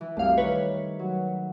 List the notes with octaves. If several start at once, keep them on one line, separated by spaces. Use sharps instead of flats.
E3 E4
C2 F#2 G3 A3 F5
D#3 B4 C#5
F#3